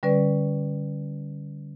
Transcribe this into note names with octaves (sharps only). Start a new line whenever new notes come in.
D3 G3 C#4 B4 D5